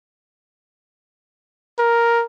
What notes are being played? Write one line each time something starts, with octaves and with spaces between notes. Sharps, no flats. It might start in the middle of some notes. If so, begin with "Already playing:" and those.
A#4